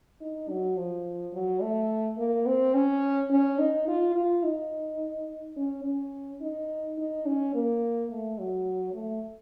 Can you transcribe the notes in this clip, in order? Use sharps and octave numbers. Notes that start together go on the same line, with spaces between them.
D#4
F#3
F3
F#3
A3
A#3
C4
C#4
C#4
D#4
F4
F4
D#4
C#4
C#4
D#4
D#4
C#4
A#3
A3
F#3
A3